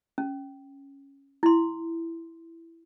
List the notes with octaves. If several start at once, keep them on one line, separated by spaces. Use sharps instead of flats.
C#4
E4 C6